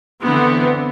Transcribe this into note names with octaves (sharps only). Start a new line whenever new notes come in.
D3 E3 B3 C4